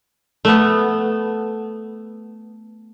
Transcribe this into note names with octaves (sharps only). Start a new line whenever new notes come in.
A3 B3